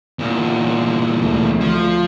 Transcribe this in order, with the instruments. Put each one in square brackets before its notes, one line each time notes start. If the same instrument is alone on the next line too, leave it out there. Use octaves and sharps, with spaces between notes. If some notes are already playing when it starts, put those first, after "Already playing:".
[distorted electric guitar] E2 A#2
[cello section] D2
[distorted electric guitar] F3